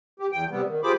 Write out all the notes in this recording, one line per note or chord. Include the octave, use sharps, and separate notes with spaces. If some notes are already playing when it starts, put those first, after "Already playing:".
G4
E2 G5
C3 G3 B3
D#3
F4 G4 G#4 C5 B5 D6